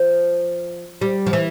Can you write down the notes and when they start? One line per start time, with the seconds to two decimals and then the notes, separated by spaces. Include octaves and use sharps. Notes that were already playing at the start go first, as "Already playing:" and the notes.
Already playing: F3
1.01 G3
1.26 F3
1.33 E3